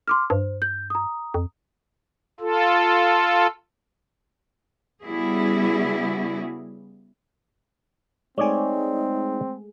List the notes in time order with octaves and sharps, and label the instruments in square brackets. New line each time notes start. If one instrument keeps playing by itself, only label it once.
[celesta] C6 D6 F6
[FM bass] G2 [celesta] C5
[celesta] G6
A#5 D#6
[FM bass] F2
[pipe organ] F4 A4
[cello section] C#3 G3 B3 E4 F#4 G#4
[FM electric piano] G#3 A3 G#4 [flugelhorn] C4 [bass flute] D#4 [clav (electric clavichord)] C#5 D5 G#5